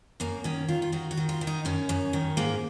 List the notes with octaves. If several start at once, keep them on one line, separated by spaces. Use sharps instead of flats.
F#2 A#3
D#3 C#4
D#3 F4
F4
D#3 F#4
F#4
D#3
F4
D#3
D#4
F#2 C#4
F#2
D#3
G#2 A#3